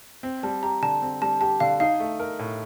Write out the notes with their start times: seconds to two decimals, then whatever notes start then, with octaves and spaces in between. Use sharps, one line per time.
0.23 C4
0.43 G3 A5
0.63 G4 A#5
0.82 D3 A5
1.02 C4
1.22 G3 A5
1.41 G4 A5
1.60 D3 F5
1.80 D#4 F5
2.00 A3
2.19 A#4
2.39 A2